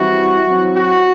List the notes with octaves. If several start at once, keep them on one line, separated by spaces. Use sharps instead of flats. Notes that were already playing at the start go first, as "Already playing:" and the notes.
Already playing: E3 G3 C4 E4 F#4
F#3 C4 E4
F#4